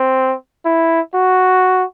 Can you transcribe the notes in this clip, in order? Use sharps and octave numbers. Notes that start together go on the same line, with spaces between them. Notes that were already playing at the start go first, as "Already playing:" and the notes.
Already playing: C4
E4
F#4